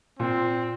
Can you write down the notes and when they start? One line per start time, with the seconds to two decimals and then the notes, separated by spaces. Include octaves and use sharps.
0.19 A#2 C4